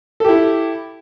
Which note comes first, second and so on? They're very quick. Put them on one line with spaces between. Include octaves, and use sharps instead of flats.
A4 G4 E4